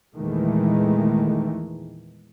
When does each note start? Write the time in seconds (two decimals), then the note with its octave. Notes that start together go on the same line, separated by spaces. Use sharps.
0.16 E2 A#2 D#3 E3 G#3 A3